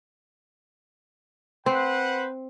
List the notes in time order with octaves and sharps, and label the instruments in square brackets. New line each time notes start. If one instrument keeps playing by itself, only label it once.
[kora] C4 [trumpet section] B4 C5 F#5